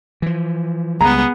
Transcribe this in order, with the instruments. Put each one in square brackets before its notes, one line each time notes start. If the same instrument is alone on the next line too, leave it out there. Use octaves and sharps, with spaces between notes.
[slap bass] E3 F3
[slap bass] C#2 G3 G#3 [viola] B3 G#4 [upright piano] A#5